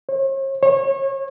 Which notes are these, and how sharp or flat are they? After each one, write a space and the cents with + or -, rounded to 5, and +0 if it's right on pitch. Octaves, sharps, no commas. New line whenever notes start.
C#5 -45
C#5 -30